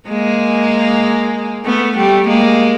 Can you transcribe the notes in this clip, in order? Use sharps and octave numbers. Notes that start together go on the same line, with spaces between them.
G#3 A#3
A3 B3
G3 A3
G#3 A#3